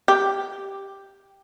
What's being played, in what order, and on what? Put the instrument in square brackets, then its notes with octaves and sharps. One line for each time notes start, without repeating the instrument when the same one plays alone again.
[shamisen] G4